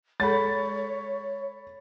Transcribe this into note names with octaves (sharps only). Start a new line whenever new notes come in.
G#3 G#4 A4 C#5 B5 A6